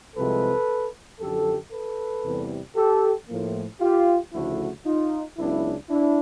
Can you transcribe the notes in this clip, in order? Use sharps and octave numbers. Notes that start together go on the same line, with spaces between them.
C2 C3 F3 G#3 A4 B4
F#2 D3 F3 G4 A4
A4 B4
E2 C3 E3 G3
G4 A4
A2 F3 A#3
F4 G4
D2 C#3 F3 A3 E4 F#4
D#4 F4
C#2 C#3 F#3 B3 D4 E4
D4 E4